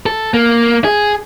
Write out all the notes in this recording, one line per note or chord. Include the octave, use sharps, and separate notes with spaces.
A4
A#3
G#4